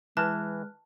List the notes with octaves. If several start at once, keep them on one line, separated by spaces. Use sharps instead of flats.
E3 G#3 B4 A5 F6 F#6